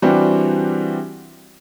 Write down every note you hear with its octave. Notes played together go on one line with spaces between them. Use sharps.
E3 G3 C4 D4 F#4 G4